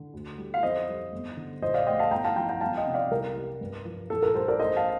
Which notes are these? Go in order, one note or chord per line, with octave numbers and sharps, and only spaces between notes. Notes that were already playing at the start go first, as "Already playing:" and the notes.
Already playing: D3
D2
G3
F5
F2 C5 D#5
G3
G1
D3
A#1 C5 D#5
D5 F5
A3 D#5 G5
F5 A5
G1 G5 A#5
F5 A5
F3 G5 A#5
G5 A#5
G1 F5 A5
D#5 G5
C3
D5 F5
C2 A#4
G3
G2
F3
A#1 A4
A#4
G3 A4 C5
A#4 D5
A1 C5 D#5
F5 A5